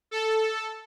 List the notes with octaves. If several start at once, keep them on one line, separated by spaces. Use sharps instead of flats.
A4